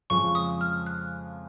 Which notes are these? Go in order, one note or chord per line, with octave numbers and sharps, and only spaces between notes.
F2 C#3 F3 G#3 C#6
D#6
F6
F#6